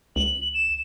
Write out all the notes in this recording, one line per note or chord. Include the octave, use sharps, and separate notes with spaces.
C#2 F#7
E7